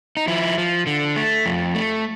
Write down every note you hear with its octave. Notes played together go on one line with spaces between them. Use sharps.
D#4
F3 E4
F3
D3
A3
F2
A3